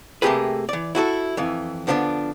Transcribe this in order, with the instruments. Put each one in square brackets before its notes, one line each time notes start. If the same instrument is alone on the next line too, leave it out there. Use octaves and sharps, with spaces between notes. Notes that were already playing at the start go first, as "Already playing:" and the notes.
[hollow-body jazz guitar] C3 A3 A#3 G4 G#4 B4
E3 D5
E4 F#4 G#4 A4
F2 E3
D3 F3 B3 C#4 D4